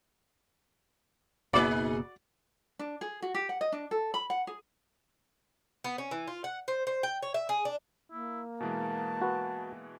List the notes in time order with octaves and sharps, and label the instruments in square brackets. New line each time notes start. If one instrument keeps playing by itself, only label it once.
[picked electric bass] F#1 B2 A#3 [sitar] D#4 G#4 B4 [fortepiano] F#4 D5
[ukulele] D4
G#4
F#4
G4
F#5
D#5
D4
A4
B5
F#5
G#4
[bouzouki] B3
C#4
E3
F4
F#5
C5
C5
G5
C#5
E5
G#4
D4
[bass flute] A#3 [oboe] E4
[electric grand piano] B2 E3 G#3 [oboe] A5
[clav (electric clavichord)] F#4 B4